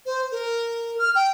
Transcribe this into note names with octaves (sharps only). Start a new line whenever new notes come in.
C5
A#4
F6
G5